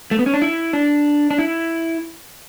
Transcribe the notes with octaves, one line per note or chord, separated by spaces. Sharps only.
A3
B3
C#4
D4
E4
D4
D4
E4